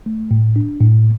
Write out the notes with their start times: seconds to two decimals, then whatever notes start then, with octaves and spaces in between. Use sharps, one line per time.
0.06 A3
0.31 A2
0.56 D4
0.80 A2